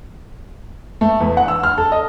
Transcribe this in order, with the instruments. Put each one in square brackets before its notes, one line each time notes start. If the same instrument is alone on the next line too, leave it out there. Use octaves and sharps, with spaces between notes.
[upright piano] A3
E2
F#5
E6
F6
A4
D#5